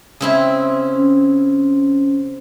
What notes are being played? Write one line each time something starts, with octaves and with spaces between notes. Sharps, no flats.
C#3 C4 E4
C#4